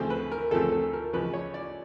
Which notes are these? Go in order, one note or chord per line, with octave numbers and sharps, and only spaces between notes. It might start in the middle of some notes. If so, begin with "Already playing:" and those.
Already playing: D2 C#3 F3 A3 C4 C5
B4
A#4
D2 C#3 F3 A3 C4 A4
A4
A#4
C#2 C#3 F3 B4
C#5
D5